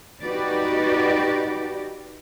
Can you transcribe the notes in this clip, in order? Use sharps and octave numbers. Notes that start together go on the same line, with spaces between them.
D#4 F#4 G4 B4 D5